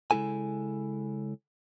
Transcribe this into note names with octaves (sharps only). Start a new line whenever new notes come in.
C#3 G#3 C#4 E4 A4 G#5